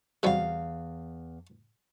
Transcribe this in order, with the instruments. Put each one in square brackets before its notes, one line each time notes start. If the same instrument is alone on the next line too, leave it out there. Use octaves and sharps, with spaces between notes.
[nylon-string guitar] E2 F5 [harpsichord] C3 F#3 G3